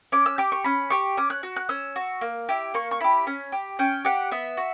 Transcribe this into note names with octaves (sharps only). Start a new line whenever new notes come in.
C#4 D6
E6
G4 D6
C#6
C#4 B5
G4 C#6
C#4 D6
F#6
F#4
F#6
C#4 E6
F#4
A#3
E4 G4
A#3 C#6
C#6
E4 G4 B5
C#4
G4
C#4 G5
G4 F#5
B3 E5
F#4